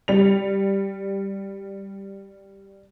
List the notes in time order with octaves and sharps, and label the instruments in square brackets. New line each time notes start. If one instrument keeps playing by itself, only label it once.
[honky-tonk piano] G3 F7